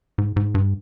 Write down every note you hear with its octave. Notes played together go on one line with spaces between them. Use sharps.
G#2
G#2
G2